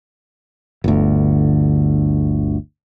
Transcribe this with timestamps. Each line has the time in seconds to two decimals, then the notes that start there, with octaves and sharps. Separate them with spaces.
0.84 G1 D2